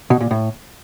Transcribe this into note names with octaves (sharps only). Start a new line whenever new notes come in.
B2
A#2
A2